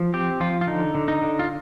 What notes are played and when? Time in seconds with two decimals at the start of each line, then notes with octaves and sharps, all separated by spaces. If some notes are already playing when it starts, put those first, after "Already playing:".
Already playing: F3
0.14 C4 G4
0.40 F3 F4
0.61 F4
0.67 D3 D#4
0.95 D3
1.08 D#4
1.22 D3
1.39 F4